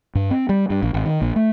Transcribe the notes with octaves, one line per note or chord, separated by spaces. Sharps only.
G2
C4
G3
G2
A#1
G#1
D#3
A#1
A3